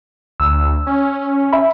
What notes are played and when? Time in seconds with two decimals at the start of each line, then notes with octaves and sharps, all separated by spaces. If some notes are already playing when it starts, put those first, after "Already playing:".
0.40 D2 E6
0.87 C#4
1.53 E5 B5